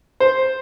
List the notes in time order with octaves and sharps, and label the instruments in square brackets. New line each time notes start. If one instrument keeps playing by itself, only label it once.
[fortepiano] C5